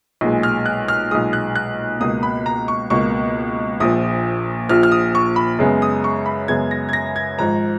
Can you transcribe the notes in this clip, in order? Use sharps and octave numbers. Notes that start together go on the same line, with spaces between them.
B1 A#2 G#3
F6
F#6
F6
B1 A#2 G#3 D#6
F#6
F#6
C#2 B2 A#3 D#6
B5
A#5
C#6
C#2 B2 A#3 C#6
A#1 A#2 F3 D#6
A#1 A#2 F3 F6
F6
D#6
C#6
B5
F#2 C#3 G#3 B3
D#6
C#6
B5
F#2 C#3 G#3 B3 G#6
A#6
G#6
A#6
G#6
G#1 G#2 F3 A#5